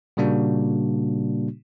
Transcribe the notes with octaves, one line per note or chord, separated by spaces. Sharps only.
A#2 C#3 G3 A#3 D4 F#4